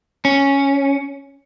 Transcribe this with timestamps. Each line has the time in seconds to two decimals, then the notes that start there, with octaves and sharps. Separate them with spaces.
0.25 C#4